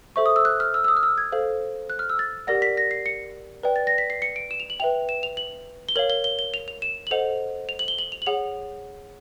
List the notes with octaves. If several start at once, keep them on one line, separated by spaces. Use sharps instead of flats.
A4 C5 E5 C#6
D#6
E6
F#6
F6
E6
E6
D#6
F6
E6
G#6
A4 C5 F5
F#6
F6
E6
A6
G4 A#4 D5 F#5 A#6
B6
A#6
C7
C#7
B4 D5 G5
A6
A#6
B6
C7
C#7
D7
E7
F7
F#7
B4 E5 G5 F7
E7
F7
F#7
G7
A#4 C#5 F5 F#7
G7
G7
G7
F7
F7
E7
F#7
A4 C5 D#5 F#5 F7
F7
F#7
G7
F#7
F7
F#7
G#4 C#5 F#5 F7